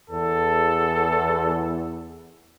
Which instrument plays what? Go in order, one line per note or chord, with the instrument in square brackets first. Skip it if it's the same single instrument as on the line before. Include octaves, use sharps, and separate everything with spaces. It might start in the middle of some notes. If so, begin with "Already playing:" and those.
[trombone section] E2 [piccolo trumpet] A4